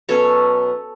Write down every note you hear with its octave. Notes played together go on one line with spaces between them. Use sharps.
B2 F#3 C#4 A4 C#5